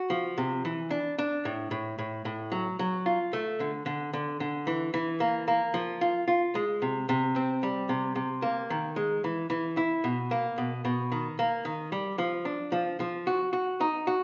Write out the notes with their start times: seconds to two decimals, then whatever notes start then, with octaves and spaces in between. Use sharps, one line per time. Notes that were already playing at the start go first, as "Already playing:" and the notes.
Already playing: F#4
0.10 F3
0.38 C3
0.65 E3
0.90 D4
1.18 D4
1.45 A2
1.71 A2
1.99 A2
2.25 A2
2.52 F#3
2.79 F#3
3.06 F4
3.33 A3
3.60 D3
3.86 D3
4.13 D3
4.40 D3
4.67 E3
4.94 E3
5.20 A#3
5.48 A#3
5.74 F3
6.01 F4
6.28 F4
6.55 G#3
6.82 C3
7.09 C3
7.36 C4
7.63 G3
7.89 C3
8.15 C3
8.42 A#3
8.70 D#3
8.96 G#3
9.24 E3
9.50 E3
9.77 E4
10.04 B2
10.31 A#3
10.58 B2
10.85 B2
11.12 D#3
11.39 A#3
11.65 D#3
11.92 G3
12.18 F3
12.45 D4
12.72 F3
13.00 F3
13.27 F#4
13.53 F#4
13.81 D#4
14.07 F#4